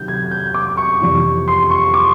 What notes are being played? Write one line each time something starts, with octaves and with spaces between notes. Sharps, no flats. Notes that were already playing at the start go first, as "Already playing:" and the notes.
Already playing: C3 D#3 F#3 G6
G#6
G6
D6
C#6
F2 C3 E3
C6
C#6
D6